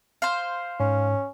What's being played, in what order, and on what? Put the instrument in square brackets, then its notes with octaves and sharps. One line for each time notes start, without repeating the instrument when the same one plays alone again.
[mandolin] C5 F5
[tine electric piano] G#2 [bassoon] C#4